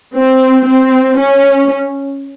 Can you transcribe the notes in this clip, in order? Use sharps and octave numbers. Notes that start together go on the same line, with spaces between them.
C4
C4
C#4